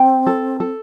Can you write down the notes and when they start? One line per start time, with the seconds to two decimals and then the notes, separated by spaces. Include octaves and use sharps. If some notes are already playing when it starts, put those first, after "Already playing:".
Already playing: C4 G5
0.27 A4
0.60 A4